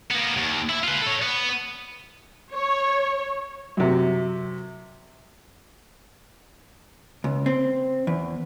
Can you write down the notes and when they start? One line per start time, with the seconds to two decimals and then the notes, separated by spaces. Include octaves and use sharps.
0.11 A#3 B3
0.37 D#2
0.69 E4
0.84 F4 B4
1.02 A4 C#5
1.22 B3
2.51 C#5
3.77 F#2 C3
7.24 C#2
7.46 C4
8.07 E2